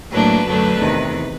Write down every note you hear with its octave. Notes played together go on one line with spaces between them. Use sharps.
A2 F#3 A#3 D4 B4
F#2 D3 F#3 A3 D4
E2 C3 D#3